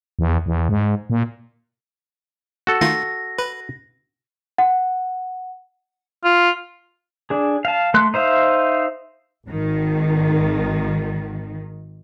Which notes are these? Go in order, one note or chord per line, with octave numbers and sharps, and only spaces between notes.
E2
E2
G#2
A#2
F#4 A4
D#3 A3 F4 A#6
B4
F#5
F4
D4 G#4
F5 A5
A3 C6 F#6
D#4 C5 E5 F5
G#1 D#3